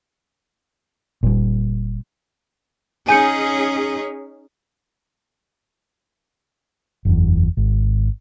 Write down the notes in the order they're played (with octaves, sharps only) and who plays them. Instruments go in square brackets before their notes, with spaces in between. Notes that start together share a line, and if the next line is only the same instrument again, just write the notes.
[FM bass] F#1 [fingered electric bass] A#2 G3
[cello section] C#4 D#4 G#4 [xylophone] G#5 G6 C#7
[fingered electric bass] F#1 E2
G#1